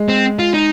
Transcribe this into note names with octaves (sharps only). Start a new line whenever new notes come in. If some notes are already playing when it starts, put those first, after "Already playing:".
Already playing: G#3
C4
F4
D#4